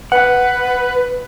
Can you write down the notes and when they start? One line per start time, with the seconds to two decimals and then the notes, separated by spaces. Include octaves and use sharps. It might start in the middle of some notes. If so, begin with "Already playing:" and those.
0.12 B4 F#5